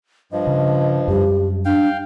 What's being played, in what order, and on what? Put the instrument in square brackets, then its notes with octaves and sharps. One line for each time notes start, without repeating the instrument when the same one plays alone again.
[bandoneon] G2 F3 [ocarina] D#5
[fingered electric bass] C#3
[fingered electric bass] F#2 G3 [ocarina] G4
[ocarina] D4 [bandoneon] F5 G5